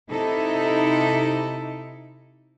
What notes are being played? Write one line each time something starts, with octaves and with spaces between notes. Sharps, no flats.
C3 D#4 E4 A4